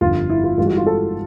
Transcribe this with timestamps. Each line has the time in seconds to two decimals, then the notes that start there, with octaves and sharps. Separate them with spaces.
0.01 G1 F2 D3 F3 F4
0.30 E4
0.44 F4
0.57 G2 E3 G#3 F4
0.67 F#4
0.77 F4
0.86 A4